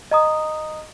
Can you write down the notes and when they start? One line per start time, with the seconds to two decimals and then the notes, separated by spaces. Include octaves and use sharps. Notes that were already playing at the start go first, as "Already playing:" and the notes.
0.11 D#5 A#5 D#6